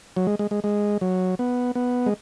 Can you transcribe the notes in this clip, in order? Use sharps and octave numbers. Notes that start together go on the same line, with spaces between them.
F#3
G#3
G#3
G#3
G#3
F#3
B3
B3
G#3